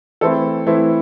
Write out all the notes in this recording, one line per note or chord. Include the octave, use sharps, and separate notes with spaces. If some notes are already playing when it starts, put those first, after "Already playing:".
E3 A3 C4 E4 A4
E3 A3 C4 E4